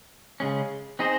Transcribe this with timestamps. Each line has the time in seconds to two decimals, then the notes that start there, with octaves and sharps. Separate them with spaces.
0.40 C#3 G#3 C#4
0.99 C4 D#4 G#4 C5 D#5